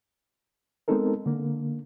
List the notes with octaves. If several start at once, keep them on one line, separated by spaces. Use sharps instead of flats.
G#3 B3 C4 D#4 A4 A#4
D3 A#3